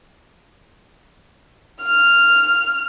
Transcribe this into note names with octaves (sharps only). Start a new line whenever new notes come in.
F6